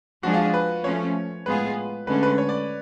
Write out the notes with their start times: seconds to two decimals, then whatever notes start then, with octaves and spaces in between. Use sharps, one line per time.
0.23 F3 G#3 D4 F#4 G#4
0.34 F4
0.54 B4
0.84 F3 A3 C#4 C#5
1.46 A2 G#3 B3 F4 G#4 B4
2.07 D2 D3 G#3 C#4 B4
2.23 B4
2.38 C#5
2.49 D5